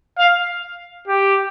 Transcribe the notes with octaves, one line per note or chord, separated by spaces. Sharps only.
F5
G4